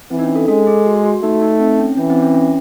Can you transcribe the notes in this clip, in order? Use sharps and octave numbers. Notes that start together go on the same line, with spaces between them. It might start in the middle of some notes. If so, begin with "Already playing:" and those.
E3 C4
D#4
C#4
A4
G#3 A4
G#4
F#4
F#4
A3 D#4
D#4
C4
C#4
E3 C#4
C4
C#4
C#4